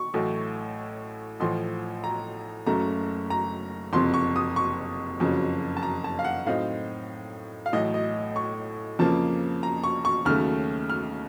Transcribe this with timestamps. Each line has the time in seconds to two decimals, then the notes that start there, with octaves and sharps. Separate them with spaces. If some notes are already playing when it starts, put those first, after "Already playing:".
Already playing: C#6
0.14 A1 A2 F#3 A3
1.40 A1 A2 F3 C6
2.04 A#5
2.66 F#1 F#2 C#3 A3 A#5
3.30 A#5
3.93 F#1 F2 C3 C6
4.14 C#6
4.36 D#6
4.56 C#6
5.20 F#1 F2 C#3 F#3
5.77 A5
5.83 A#5
6.04 A5
6.19 F5
6.24 F#5
6.46 A2 F#3 C4 D#4 F5
7.66 F5
7.73 A1 A2 F#3 A3 D#5
7.94 D#5
8.36 C#6
8.99 F2 C#3 F3 A#3 A5
9.63 A#5
9.84 C#6
10.05 C#6
10.25 D#2 C#3 F#3 A3 F6
10.90 F6